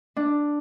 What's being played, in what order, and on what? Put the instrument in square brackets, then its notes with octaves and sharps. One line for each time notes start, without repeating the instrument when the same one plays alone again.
[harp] D4